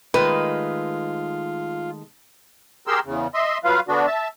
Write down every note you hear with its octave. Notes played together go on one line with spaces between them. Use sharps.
D#3 G#3 A3 F4 B4
G4 G#4 A#4 C6 E6
E2 C#3
D#5 E5 C6
F#3 F4 B4 F5
D3 B3 D4 F#4
E5 A5